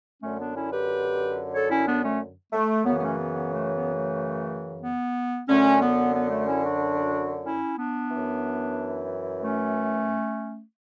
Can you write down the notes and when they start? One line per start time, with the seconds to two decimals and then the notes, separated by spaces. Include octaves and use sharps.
0.22 F#2 D3 A3 C#4
0.39 B3 D4
0.55 C#4 E4
0.71 G4 B4
1.54 A4 C#5
1.71 C#4 E4
1.86 B3 D4
2.04 A3 C#4
2.52 A3
2.85 F#2 C#3 E3 B3
2.97 B3
3.01 A3 C#4
3.17 B3
3.34 B3
3.51 A3
3.73 B3
3.94 A3
4.82 B3
5.48 F#2 D3 A3 C#4
5.81 B3
6.14 B3
6.30 A3
6.46 C#4 E4
6.63 D4 F#4
7.45 C#4 E4
7.78 B3 D4
8.11 F#2 E3
9.42 A3 C#4